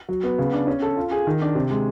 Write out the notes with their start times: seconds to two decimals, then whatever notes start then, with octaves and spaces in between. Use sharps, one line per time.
0.09 F#3
0.23 B3
0.38 C#3
0.53 D4
0.67 C#4
0.82 A4
0.96 F4
1.11 G#4
1.27 D#3
1.42 D4
1.55 C3
1.71 G#3